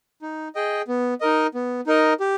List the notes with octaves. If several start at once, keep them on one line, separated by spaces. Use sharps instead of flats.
D#4
G#4 D#5 G5
B3
D#4 A#4 D#5
B3
D#4 A#4 D#5
G4